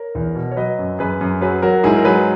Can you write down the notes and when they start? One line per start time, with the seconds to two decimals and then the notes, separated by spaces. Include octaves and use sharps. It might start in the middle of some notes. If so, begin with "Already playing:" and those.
Already playing: A#4 C#5
0.15 E2
0.35 B2
0.51 C#5
0.57 F#3 B4 D#5
0.79 F#2
0.99 F#2 G#4 B4
1.21 F#2
1.41 F#3 G#4 B4
1.63 F#3 F#4 A#4
1.83 G#2 E4 G#4
1.96 A#4
2.05 F#3 G#4 B4